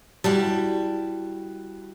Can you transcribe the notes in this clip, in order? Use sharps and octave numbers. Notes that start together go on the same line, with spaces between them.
G3 E4 F#4 A5